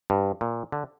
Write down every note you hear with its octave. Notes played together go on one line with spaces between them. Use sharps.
G2
A#2
D3